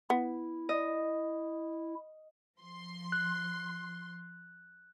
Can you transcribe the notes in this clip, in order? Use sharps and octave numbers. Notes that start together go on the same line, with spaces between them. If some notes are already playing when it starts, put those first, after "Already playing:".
B3 E4
D#5
F3 C6
F#6